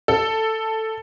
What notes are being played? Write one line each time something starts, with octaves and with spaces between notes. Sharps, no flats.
A4